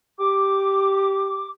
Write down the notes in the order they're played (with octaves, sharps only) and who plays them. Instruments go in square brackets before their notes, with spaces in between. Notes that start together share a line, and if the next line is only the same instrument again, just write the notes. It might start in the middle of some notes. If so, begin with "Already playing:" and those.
[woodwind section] G4 D6